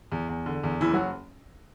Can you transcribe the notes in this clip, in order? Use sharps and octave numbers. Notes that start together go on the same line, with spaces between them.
E2
E2
D3
E2
F#1 E3 E4
F#3 F#4